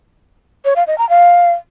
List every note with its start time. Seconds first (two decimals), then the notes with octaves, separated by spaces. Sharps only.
0.65 C#5
0.76 F5
0.87 D#5
0.98 A#5
1.09 F5